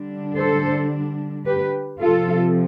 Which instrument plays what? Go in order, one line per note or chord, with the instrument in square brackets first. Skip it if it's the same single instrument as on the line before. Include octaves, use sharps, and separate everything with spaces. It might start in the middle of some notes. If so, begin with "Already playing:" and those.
Already playing: [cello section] D3 G3 D4
A4 C5
G4 B4
C3 F3 C4 F4 A4